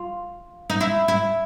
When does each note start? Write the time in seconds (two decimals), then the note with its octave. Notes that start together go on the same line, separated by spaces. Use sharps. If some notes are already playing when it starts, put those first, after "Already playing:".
Already playing: F4
0.70 D#4
0.81 E4
1.08 E4